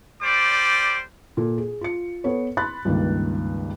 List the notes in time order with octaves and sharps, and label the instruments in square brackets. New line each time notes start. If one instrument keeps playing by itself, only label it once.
[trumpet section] G3 C5 D5 D6
[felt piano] A#2 A4
G#4
F4 C#7
B3 A4 B4 C#5
B5 C6 F#6 A6
C#2 G2 D#3 A#3